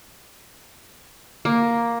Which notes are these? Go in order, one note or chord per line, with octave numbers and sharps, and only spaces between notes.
A#3